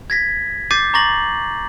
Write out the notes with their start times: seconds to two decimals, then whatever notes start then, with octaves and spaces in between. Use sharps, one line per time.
0.10 G#6 A#6 B6
0.71 D6 G6 A6 C7 D#7
0.94 A#5 C#6 D6 A6 A#6 F#7